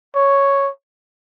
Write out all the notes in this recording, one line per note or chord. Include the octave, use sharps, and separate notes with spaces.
C#5